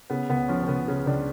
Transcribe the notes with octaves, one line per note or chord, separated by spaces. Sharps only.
C#3 B3
C#2 B3
F3 C#4
C#4
C#2 B3
C#3
C#2 D4